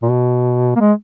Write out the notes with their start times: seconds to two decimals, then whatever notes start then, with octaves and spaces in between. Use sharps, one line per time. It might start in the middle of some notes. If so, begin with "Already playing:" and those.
0.02 A#2
0.09 B2
0.76 A#3
0.80 G#3